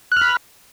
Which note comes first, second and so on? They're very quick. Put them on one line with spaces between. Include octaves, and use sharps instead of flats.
F#6 F6 B5